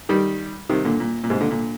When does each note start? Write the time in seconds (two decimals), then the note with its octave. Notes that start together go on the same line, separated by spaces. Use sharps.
0.09 D#3 G3
0.70 C3 D#3
0.85 A#2 D3
1.00 A#2
1.24 A#2
1.30 G#2 C3
1.41 A#2 D3
1.51 A#2 D3